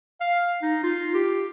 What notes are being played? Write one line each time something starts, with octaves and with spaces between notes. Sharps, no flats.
F5
D#4
F4
G4